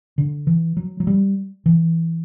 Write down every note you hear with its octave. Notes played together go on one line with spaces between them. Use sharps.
D3
E3
F#3
F#3
G3
E3